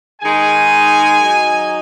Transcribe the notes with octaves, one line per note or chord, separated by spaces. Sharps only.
D#3 G#3 D#4 G#5
F#3 D#4